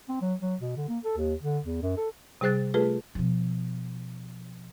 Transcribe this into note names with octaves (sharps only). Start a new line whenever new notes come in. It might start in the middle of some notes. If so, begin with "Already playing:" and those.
C4
F#3
F#3
B2
D3
A#3
A4
D#2
D3
E2
F#2
A4
C3 G3 G#4 C5 F#6 A6
A3 F4 G#4 A4 B4
B2 F3